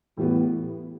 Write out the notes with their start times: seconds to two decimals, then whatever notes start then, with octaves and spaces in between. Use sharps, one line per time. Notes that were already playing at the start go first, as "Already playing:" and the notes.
0.17 A2 E3 G3 B3